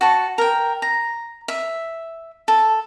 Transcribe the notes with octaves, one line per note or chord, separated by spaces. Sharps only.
F#4 A5 C#6
A#4 G5
A#5
E5
A4